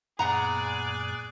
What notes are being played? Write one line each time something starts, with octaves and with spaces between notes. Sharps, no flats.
F#2 A#2 B3 G#4 D5 F#5 A#5 F#6